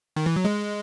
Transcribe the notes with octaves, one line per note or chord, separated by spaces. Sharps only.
D#3
E3
F#3
G#3